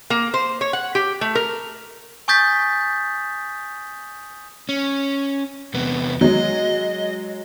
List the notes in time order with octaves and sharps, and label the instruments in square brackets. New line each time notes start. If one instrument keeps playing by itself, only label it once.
[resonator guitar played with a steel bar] A#3
C5
C#5
F#5
G4
A3
A#4
[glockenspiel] G#5 C#6 D#6 G6 A6 B6
[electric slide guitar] C#4
E2 C3 B3
[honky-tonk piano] F#3 G#3 [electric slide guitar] D#5